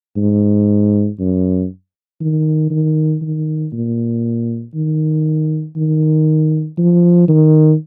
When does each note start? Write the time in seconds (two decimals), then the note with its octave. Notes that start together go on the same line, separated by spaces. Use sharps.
0.17 G#2
1.19 F#2
2.21 D#3
2.71 D#3
3.22 D#3
3.73 A#2
4.75 D#3
5.77 D#3
6.78 F3
7.29 D#3